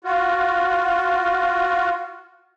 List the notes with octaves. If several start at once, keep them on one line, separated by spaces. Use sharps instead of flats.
F4 F#4